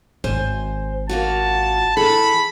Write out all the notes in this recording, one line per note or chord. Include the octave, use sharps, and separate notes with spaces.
G#1 C5 G#5
A#3 F4 F#4 A5
E3 G#4 A4 B5